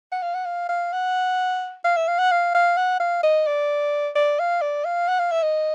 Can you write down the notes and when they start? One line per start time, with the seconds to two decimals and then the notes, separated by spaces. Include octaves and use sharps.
0.12 F#5
0.22 F5
0.34 F#5
0.45 F5
0.69 F5
0.93 F#5
1.84 F5
1.96 E5
2.08 F5
2.19 F#5
2.31 F5
2.54 F5
2.77 F#5
3.00 F5
3.23 D#5
3.47 D5
4.16 D5
4.39 F5
4.61 D5
4.85 F5
5.08 F#5
5.19 F5
5.31 E5
5.42 D#5